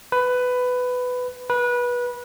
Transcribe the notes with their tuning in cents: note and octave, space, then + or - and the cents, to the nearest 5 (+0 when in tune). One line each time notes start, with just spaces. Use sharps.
B4 +15
B4 -20